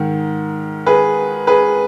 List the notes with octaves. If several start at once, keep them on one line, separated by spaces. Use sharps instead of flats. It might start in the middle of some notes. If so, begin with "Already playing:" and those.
Already playing: G#2 D#3
G#4 B4
G#4 B4